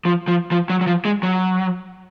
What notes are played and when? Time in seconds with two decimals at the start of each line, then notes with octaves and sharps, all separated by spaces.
0.05 F3
0.28 F3
0.51 F3
0.70 F#3
0.81 F#3
0.87 F3
1.05 G#3
1.23 F#3